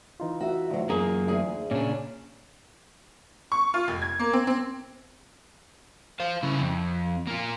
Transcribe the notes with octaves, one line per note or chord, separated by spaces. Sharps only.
E3 D#4 F4
F#4 E5
D2 F#3
F#2 A#3 G#4 A#5
D2 G#4 G#5
A#2 C#3 C#4 D4
C#6
F4
F1
G#6
A#3
C4
C4
C5 F5
C#3 E4
F2
A#3 F4